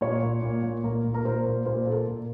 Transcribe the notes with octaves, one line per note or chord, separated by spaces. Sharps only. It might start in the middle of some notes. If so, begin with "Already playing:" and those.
A#2 C#5
A#2
A#2
A#2
A#2 A#4
A#2
A#4
A#2 C5
A#2
A#2 C5
A#2 A4
A#4
A#2